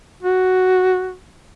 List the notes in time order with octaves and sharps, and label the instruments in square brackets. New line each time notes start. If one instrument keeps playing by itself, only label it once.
[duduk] F#4